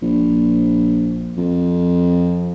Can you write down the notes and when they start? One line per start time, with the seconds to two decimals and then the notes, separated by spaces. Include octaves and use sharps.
0.02 A#1
1.37 F2